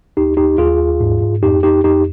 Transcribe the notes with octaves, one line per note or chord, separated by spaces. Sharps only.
D#2 D#4 G4
D#2 D#4 G4
D#2 F4 G#4
D#2
G#2
G#2
F2 D#4 G4
F2 D#4 G4
F2 D#4 G4